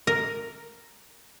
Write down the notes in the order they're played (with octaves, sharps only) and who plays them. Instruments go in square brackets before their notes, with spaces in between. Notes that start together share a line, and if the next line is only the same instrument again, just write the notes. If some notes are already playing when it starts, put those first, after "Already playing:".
[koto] A#4